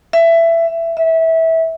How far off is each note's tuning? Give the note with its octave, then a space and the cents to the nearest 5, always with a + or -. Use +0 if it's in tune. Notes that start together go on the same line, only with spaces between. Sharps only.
E5 +15
E5 -20